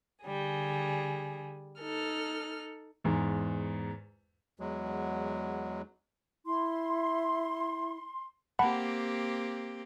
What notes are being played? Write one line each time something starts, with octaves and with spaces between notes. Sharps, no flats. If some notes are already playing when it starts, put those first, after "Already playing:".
D3 G3 G#4
D#4 A4 F6
E2 G#2
E2 F#3 G#3
E4 C6
A#3 C4 G4 F#5 A5 B5